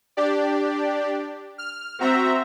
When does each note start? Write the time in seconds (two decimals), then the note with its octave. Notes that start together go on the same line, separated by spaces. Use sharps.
0.17 D4 G4 D5
1.58 F6
2.00 C4 F#4 E5 A#5